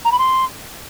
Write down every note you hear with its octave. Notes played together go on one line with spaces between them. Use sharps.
A#5
B5
C6